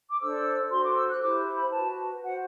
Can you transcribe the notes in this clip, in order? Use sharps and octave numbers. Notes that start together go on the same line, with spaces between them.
D6
D4 A4 C5 E6
F#4 A4 C5 C6
D6
E6
F#6
E4 G4 C5 D6
B5
F#4 B4 A5
F#4 C5 F#5